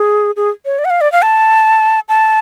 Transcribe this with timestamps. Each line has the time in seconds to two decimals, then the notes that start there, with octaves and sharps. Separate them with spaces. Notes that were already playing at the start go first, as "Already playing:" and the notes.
Already playing: G#4
0.36 G#4
0.65 C#5
0.79 D5
0.85 F#5
0.90 F5
1.01 D5
1.12 F5
1.22 A5
2.09 A5